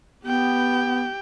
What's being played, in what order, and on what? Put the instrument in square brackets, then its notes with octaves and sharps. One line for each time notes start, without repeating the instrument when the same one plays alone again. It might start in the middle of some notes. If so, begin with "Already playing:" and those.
[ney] B3 [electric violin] G4 G5